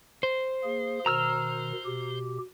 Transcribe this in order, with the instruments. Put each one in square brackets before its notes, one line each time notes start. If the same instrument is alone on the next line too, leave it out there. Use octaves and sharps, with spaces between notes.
[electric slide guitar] C5
[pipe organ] A#3 G#4
[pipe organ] B2 D#3 [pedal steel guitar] A#5 E6 F6
[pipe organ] B2 G4